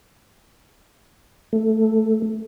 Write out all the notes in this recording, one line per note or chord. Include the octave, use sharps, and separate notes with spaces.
A3